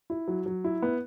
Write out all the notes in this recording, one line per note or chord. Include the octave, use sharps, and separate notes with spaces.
E4
F#3
F#3
E4
B3